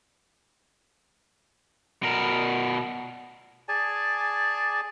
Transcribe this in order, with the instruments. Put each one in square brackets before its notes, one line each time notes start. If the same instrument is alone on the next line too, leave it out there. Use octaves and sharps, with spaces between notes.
[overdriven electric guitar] B2 A#4
[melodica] G#4 D5 G#5 A5